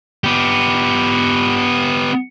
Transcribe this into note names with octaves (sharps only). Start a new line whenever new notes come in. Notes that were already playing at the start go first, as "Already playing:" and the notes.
B3 G4